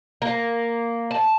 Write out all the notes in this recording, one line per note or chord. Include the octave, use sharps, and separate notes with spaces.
A#3
A5